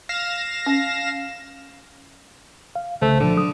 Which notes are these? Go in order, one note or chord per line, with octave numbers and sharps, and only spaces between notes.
F5 A#6 E7
C#4
F5
C2 C#3 A3 C5
A#2 D3 F3
F#3 A4 D#6